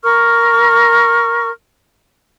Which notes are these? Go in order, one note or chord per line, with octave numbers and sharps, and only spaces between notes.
A#4 C#6 F6